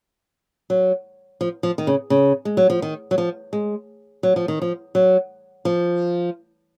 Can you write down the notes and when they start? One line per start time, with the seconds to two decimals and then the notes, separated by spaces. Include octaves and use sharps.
0.70 F#3
1.41 F3
1.63 F3
1.78 D#3
1.87 C#3
2.10 C#3
2.45 G#3
2.57 F#3
2.70 F3
2.82 D#3
3.11 F#3
3.18 F3
3.53 G#3
4.23 F#3
4.36 F3
4.48 D#3
4.62 F3
4.95 F#3
5.65 F3